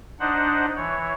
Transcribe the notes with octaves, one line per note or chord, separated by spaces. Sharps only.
D4 D#4 C5 F#5
E3 C#5